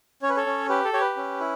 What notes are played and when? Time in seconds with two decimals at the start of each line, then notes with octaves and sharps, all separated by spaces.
0.22 C#4 C#5
0.29 B4
0.36 A4 C#5
0.46 C#4
0.69 G4 B4
0.85 A4
0.93 G4 C#5
1.01 B4
1.17 C#4
1.40 E4